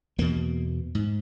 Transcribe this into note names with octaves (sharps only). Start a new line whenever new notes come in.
E2 B2 A#3
G#2